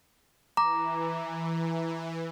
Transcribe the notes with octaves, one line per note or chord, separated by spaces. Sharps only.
E3 A#5 D6